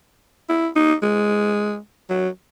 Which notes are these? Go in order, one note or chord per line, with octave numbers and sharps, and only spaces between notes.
E4
D#4
G#3
F#3